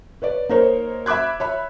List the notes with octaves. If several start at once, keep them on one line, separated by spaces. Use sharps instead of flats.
B4 C#5 D5
A#3 D#4 A#4 C5 C#5
E5 B5 D6 F#6 G#6
C#5 E5 B5